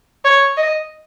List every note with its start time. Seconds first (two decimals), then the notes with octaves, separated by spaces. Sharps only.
0.25 C#5
0.57 D#5